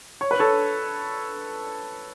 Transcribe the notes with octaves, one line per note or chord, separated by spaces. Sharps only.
C#5
B4
A4 C#5